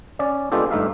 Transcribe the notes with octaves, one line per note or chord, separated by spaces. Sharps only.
C#4 D5
G#3 B3 D4 F4 G4 A4
G2 A3 D#4 E5 F5